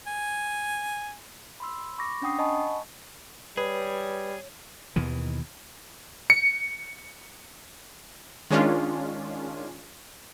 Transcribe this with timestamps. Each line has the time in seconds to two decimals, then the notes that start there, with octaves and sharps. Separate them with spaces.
0.07 G#5
1.60 B5 C6 E6
1.98 B5 C#6 D6 A#6
2.22 C#4 D4 F#5 G5 D#6 C7
2.39 D#5 F#5 G#5 A5 B5 C#6
3.57 G3 G#4 B4 C#5
4.96 D#2 B2 D#3 E3
6.30 C#7
8.51 D#3 G#3 C#4 D4 F4